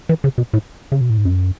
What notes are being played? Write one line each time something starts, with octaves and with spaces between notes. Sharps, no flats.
E3
C#3
B2
A2
C#3
B2
A2
G#2
F#2